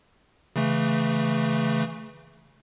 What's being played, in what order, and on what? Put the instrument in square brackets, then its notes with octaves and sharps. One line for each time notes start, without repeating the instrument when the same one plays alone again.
[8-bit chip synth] C#3 E3 A3